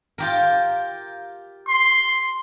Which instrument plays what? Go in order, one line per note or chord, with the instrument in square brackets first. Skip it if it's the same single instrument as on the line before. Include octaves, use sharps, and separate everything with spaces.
[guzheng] F4 G4 A#4
[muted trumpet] C6